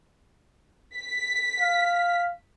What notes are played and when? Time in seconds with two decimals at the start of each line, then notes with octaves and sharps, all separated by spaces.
0.96 B6
1.60 F5